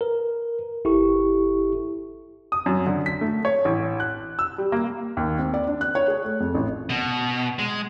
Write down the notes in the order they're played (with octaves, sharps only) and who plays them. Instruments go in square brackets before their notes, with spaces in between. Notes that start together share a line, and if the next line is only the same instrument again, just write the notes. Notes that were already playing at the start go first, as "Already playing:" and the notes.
[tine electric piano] A#4 B4
G1 E4 G4 A4 C#6
[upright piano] D#6
F#2
D3
B6
A3
C#5
A1
F#6
E6
G3
A#3
[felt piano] D#2
C4
D5
D4
F#6
C#5
G#4
A3
F2
A1
[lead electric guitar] B2
G#3